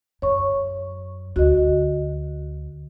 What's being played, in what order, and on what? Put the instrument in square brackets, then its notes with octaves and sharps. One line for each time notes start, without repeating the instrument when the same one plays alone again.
[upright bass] F#2 [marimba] C#5 C#6
[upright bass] D2 [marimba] F#4 D#5